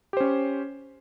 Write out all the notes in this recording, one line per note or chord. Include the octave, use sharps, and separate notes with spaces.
C#4 G4 C5 C#5